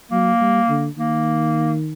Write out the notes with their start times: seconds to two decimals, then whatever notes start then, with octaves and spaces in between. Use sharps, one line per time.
0.11 F#3 A#3
0.41 G3
0.69 D3
0.98 D#3 A#3